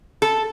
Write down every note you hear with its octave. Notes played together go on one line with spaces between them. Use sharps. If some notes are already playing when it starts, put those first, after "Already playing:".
A4